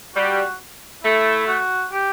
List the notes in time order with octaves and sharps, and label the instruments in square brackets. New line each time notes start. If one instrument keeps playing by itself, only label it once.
[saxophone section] G3 [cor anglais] F#4
[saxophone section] A3 [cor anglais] E4
[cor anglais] F#4
G4